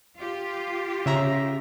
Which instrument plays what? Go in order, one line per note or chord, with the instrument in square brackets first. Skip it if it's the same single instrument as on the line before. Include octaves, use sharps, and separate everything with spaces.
[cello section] F4 G4
[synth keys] C#3 E5 A#5